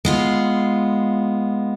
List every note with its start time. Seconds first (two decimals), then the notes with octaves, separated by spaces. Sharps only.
0.05 G#3 B3 F4